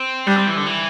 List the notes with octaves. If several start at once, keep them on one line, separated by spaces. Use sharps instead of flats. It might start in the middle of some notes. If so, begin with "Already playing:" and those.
Already playing: C4
G3 D4
C4
E3
D3
E3